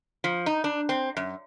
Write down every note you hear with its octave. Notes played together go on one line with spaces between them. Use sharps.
F3
D#4
D4
C4
F#2